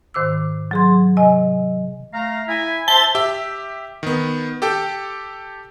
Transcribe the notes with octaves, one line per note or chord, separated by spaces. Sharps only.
G#2 D#3 C5 D6 E6
F#3 G#4 C6
C3 D#5 G#5
A3 F5 A#5
E4 E5 G#5
C5 E5 A5 G7
G4 E5
D#3 B3
G4 A4 G5